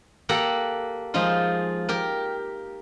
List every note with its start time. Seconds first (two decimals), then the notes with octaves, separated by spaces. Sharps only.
0.29 A#3 G4 A4 F#5 A#5
1.14 F3 G#3 D#4 F4
1.89 G4 A#4